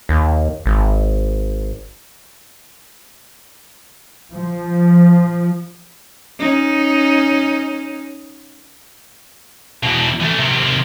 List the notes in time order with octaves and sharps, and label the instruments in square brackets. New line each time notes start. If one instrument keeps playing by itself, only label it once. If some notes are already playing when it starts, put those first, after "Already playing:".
[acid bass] D#2
G#1
[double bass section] F3
[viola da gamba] C#4 D#4
[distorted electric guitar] E2 B2
E3 A3
C3 D#3